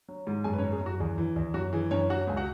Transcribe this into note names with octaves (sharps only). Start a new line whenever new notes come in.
F#3
G#2
F#2 G#4 G#5
B4
C#4 C#5
F#3
G#4
F#2 F#4
E2 G#4
E3
E2
F#2 F#4
E3 G#4
F#2 C#4 C#5
F#3 F#4 F#5
C#2 G#5
F#4 F#5